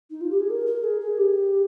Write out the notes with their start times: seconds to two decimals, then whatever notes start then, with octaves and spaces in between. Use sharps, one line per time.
0.11 D#4
0.21 F4
0.30 G4
0.40 G#4
0.50 A#4
0.66 A#4
0.84 G#4
1.01 G#4
1.18 G4